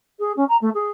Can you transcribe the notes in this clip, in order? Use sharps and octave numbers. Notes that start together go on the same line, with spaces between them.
G#4
C#4
A#5
A3
G#4